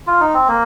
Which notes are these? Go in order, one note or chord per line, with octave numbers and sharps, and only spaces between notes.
F4
D#4
C4
A#3